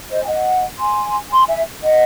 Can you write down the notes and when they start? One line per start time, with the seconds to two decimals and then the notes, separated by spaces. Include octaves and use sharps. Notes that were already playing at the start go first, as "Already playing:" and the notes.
0.09 C5 D#5
0.23 G#5
0.27 D#5 F#5
0.79 G#5 C6
1.30 G#5 C6
1.48 E5 G#5
1.82 D#5 F#5